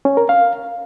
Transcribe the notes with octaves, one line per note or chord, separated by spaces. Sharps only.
C#4
A#4
F5